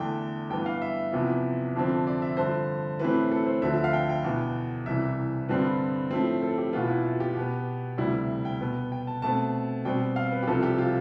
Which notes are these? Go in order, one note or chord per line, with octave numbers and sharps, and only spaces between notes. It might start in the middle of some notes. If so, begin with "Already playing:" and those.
Already playing: E2 D3 A3 G5
G2 E3 B3 G5
F5
E5
E2 C3 F3 B3
F2 D3 F3 C4
D5
E5
G2 D3 F3 C5
A2 E3 A3 C4 B4
A4
C5
D2 D3 F3 E5
E5
F5
G5
G5
E2 B2 B3
C2 C3 E3 E5
G2 D3 G3 C4 B4
A2 F3 A3 C4
A4
G4
E2 B2 B3 F4
E4
F4
G4
B2 B3
D2 C3 G3 E4
G5
B2 B3
G5
A5
B2 A3 C4 A5
B2 G3 C4 G5
F5
B4
G4
C2 C3 F3 C4 A4
G4
F4